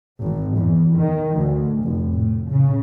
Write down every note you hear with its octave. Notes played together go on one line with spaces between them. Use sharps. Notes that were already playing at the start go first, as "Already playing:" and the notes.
G#1
E2
D#3
D2
F1
A2
C#3